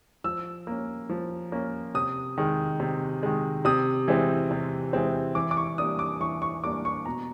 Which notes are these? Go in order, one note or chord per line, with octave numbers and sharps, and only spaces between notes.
F3 E6
A#3 C#4
F3
A#3 C#4
C3 D#6
D#3 G#3
C3
D#3 G#3
C3 D#6
E3 G#3 C4
C3
E3 G#3 C4
E3 D6
D6
C#6
G3 A#3 D4 D#6
D6
E3 C#6
C#6
G3 A#3 D4 D6
C#6
B2 A#5